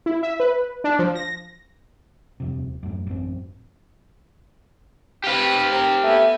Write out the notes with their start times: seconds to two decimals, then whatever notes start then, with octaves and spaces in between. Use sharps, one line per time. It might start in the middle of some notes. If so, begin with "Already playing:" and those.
0.06 E4
0.23 E5
0.40 B4
0.84 D4
0.99 F3
1.15 A#6
2.40 D#1 F2 C3
2.83 F#2 A2
3.07 A1 F#2 C4
5.24 C4 G4 B4 F5
5.71 C4 A#4
6.03 A3 B3 G#5